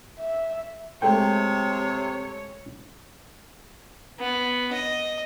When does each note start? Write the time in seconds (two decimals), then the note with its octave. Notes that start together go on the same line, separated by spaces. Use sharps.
0.20 E5
1.02 C3 G#3 A3 C#5 G5
4.19 B3
4.73 D#5